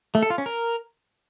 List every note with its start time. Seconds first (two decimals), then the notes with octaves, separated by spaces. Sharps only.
0.15 A3
0.23 A4
0.30 F4
0.38 C#4
0.46 A#4